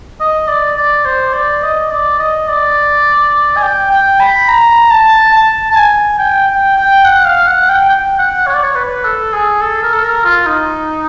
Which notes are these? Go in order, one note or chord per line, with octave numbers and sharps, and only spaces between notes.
D#5
D5
D5
C5
D5
D#5
D5
D#5
D5
G#5
G5
G5
B5
A#5
A5
A5
A5
G#5
G5
G5
G5
F#5
F5
F#5
G5
G5
F#5
C#5
D5
C#5
B4
A4
G#4
A4
A#4
A4
A#4
F4
D#4